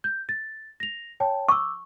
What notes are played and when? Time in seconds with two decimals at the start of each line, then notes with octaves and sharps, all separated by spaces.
0.04 G6
0.29 A6
0.80 A#6 F7
1.20 C#5 G5 A5
1.49 C#6 D6 E6